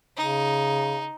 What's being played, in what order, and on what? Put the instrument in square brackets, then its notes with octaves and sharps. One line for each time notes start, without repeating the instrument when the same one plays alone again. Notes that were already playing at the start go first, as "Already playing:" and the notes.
[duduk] C#3 [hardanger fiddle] D#4